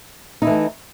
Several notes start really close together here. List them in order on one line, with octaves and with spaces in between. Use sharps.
D#4 E4 E3 A3